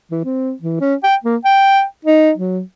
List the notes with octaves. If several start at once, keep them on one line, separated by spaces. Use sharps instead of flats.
E3
C4
E3
C#4
G5
A#3
G5
D#4
F#3